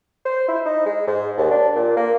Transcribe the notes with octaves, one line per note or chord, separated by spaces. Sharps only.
C5
E4
D#4
G#3
G#2
D#2
D4
A#2
A#3